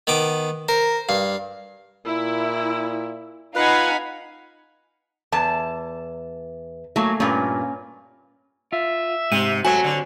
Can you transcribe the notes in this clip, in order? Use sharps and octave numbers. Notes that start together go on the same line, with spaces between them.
D#3 B3 D6
A#4 C5
G2 F5
A#2 E4
D#4 F4 B4 F5 F#5 G#5 B5
E2 A5
F#3 A3 A#3 G#5
G2 A#2 C#4 A#4
F4 E5
G#2 C3 D#7
F#3 A3 F#4 C5 C#5 G#5
D3